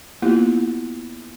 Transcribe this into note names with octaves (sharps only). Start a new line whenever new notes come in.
A#3 B3 E4 F4 G4